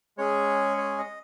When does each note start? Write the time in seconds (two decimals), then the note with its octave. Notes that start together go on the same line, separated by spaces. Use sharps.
0.17 G#3 C#4 G#4 C#5
0.77 C#5
0.98 D#5